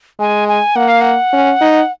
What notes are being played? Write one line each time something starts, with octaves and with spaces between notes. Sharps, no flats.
G#3 G#5
G#5
A#3 F#5
F5
F#5
C#4
D#4